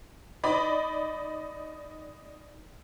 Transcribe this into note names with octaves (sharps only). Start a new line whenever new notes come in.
D#4 D5 B5